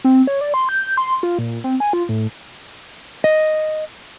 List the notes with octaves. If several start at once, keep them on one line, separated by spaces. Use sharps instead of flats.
C4
C#5
D5
C6
G6
C6
F4
A#2
C4
G#5
F4
A2
D#5